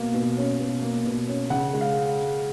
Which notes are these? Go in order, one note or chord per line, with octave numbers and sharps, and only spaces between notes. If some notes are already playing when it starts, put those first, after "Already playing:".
Already playing: B2 A#3 F5
B2
C#4
B2
A#3
B2
C#4
C#3 F#5
G#3
F5